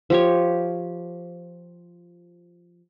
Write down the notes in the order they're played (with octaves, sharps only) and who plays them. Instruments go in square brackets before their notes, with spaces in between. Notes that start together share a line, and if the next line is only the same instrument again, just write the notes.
[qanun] F3 G4 C#5